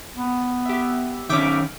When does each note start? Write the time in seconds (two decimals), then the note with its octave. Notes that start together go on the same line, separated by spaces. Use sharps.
0.16 B3
0.66 G4 E5
1.29 D#3 C#4 E5 G5 D6